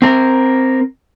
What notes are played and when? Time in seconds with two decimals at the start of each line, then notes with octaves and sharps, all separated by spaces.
0.02 C4 A#4